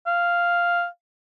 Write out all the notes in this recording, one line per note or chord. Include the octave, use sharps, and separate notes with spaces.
F5